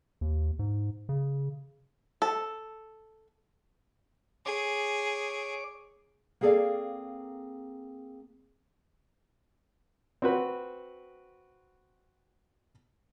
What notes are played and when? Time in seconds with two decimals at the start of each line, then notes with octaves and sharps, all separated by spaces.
0.21 D#2
0.59 G#2
1.09 C#3
2.22 A4
4.46 G#4 C#5 D6
6.41 A#3 C4 G#4 A4 D5 F5
10.22 C4 F#4 B4